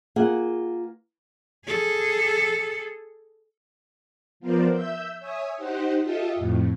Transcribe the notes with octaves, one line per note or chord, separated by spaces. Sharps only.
A#3 F4 G#4 F#5
G#4 A4
F3 B3 A#4 C5 D5
E5 E6 G6
C#5 E5 G#5 D#6
D#4 G4 C5 F#5
F4 G4 A4 D#5 E5
F2 A2